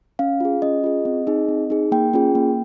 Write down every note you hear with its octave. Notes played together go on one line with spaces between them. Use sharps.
C#4 F5
F4 G#4
C#4 D#5
F4 G#4
C4
D#4 G#4
C4
D#4 G#4
A#3 G5
C#4 F4 G#4
A#3